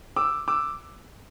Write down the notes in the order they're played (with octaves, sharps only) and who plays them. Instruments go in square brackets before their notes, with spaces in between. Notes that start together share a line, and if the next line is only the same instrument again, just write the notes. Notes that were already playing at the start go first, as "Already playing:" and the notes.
[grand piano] D6 E6
D6 E6